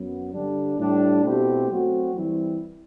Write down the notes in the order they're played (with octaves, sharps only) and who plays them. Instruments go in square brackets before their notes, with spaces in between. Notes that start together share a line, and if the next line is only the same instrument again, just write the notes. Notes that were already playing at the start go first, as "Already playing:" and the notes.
Already playing: [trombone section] F#2 F#3 B3
G2 D3 G3 D4
A2 G3 D4 G4
B2 A3 C4 E4 G4
F#3 A3 C4 F#4
E3 G3 C4 E4